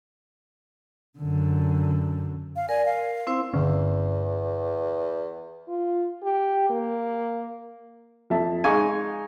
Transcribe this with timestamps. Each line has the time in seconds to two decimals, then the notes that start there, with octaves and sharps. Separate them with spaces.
1.19 F#2 D3
2.56 F5
2.69 A#4 D5 G#5
2.84 F5
3.27 C4 E4 C5
3.54 G1 E2 D3 C#4
5.69 F4
6.23 G4
6.70 A#3
8.30 F2 E5 A5
8.64 G#3 D#4 F5 G#5 C#6